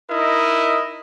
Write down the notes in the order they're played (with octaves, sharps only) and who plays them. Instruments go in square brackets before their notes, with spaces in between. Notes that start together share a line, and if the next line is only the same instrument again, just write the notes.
[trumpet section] D#4 E4 A#4 D#5